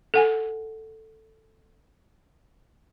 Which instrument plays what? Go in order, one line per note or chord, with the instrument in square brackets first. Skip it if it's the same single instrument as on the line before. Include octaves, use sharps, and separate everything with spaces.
[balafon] A4 F#5 G#5